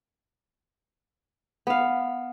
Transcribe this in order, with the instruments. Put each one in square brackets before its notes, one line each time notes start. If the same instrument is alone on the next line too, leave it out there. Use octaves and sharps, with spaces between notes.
[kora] B3 F5